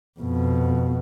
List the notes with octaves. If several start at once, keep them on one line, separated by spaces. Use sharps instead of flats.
F2 B2